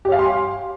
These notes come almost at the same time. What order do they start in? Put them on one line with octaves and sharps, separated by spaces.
G4 C#5 F5 G#5 C6